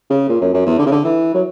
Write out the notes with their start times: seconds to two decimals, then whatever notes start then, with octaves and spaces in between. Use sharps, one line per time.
0.10 C#3
0.29 A#2
0.41 F#2
0.54 F#2
0.66 E2
0.79 D3
0.86 C#3
0.91 D3
1.04 E3
1.34 F#3